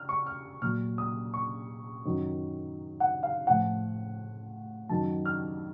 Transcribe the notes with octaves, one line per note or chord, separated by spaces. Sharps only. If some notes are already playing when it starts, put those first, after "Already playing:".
Already playing: F6
C#6
F6
A#2 F#3 F6
D#6
C#6
F#2 D#3 F#3
F#5
F5
A2 F3 F#5
F#2 D#3 F#3 A5
F6